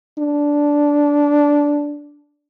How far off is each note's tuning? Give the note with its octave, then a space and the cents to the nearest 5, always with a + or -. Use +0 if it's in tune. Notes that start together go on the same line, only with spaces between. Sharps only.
D4 -10